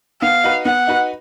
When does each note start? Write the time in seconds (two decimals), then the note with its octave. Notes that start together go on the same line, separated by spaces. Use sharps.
0.22 B3 F5
0.44 D#4 F#4 B4
0.65 B3 F#5
0.87 D#4 F#4 B4